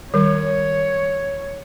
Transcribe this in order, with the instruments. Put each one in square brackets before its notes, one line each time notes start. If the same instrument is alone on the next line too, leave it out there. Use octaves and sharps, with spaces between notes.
[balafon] D#3 G3 [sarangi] C#5